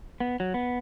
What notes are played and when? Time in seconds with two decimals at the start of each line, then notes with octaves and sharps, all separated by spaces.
0.20 B3
0.40 F#3
0.54 B3